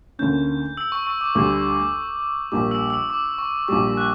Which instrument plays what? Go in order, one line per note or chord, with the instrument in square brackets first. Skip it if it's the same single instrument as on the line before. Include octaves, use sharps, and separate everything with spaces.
[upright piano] D2 D3 A#3 C#4 [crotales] G6
[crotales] E6
C#6
C#6
D6
[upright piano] D2 D3 G3 [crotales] D6
[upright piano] A#1 A#2 G3 A#3 [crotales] D6
[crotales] E6
E6
D6
C#6
[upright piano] A#1 A#2 G3 [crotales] D6
[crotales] F#6